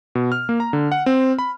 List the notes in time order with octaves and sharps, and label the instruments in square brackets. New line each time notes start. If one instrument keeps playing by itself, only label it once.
[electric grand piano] B2
F6
A#3
A#5
D3
F#5
C4
B5